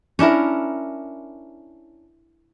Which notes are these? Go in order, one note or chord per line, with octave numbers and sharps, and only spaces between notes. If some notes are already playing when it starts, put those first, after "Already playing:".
C#4 D4 E4 A#4